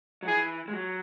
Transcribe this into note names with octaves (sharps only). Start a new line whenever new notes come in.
F#3
E3 G#4
G#3
F#3